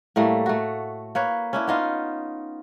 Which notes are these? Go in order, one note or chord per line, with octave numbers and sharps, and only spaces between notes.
A2 G3 A3 A#3
A3 F#4
A#3 B4 C#5
C#4 D4 E4
B3 D#4 F4